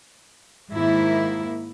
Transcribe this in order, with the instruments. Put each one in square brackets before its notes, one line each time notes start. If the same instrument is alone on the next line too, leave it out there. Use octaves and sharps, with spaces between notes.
[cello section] G#2 D#3 A#3 E4